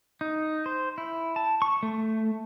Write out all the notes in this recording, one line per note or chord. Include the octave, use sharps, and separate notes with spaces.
D#4
C5
E4
A5
C#6
A3